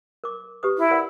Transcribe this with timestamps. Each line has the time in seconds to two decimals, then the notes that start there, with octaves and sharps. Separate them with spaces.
0.24 A#4 D6
0.63 G4 B4 D#6
0.78 E4
0.91 A#4 D5 F#5